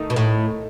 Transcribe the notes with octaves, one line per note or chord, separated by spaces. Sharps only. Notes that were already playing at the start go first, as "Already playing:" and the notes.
Already playing: D#3 A3 D#4
B2
A2